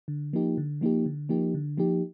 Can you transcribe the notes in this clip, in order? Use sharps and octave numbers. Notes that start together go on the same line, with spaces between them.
D3
F3 A#3 D#4 G4
D3
F3 A#3 D#4 G4
D3
F3 A#3 D#4 G4
D3
F3 A#3 D#4 G4